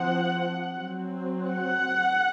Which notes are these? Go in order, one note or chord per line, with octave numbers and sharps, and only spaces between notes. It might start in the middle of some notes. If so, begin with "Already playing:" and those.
Already playing: F3 C4 F#5
F#3 C4
F#5